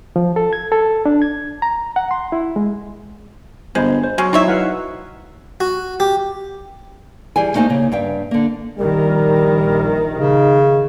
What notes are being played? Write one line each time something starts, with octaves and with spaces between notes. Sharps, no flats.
F3
A4
G#6
A4
D4
G#6
A#5
F#5
C6
E4
G#3
G1 G#3 C5 D#5 B5
C5
F#3 G#3 C#4
C4 D#4 E4 C#5 D5 E5
E4 B4 F5 F#5
F#4
G4
E3 G3 G#4 G#5
A3 A#3 D#4 C5 G#5
C#3 A#3
G2 E5 F5 G5
D3 A#3
A#1 D#3 G3 A#4
C#3 D#4